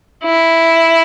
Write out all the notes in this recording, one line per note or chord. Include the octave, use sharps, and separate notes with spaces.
E4